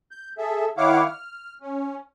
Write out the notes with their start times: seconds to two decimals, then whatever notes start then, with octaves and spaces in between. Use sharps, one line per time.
0.11 G6
0.38 G#4 A4 E5
0.77 D#3 E4 C#5 F5 F#5 D6
1.06 F6
1.62 C#4